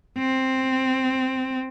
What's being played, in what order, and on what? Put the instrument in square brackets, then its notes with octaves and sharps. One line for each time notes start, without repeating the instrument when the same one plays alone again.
[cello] C4